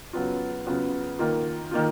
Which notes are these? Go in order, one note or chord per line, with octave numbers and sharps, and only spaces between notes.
C#3 F#3 B3 F4
C#3 F#3 B3 F4
D#3 A#3 F4
D#3 A#3 F4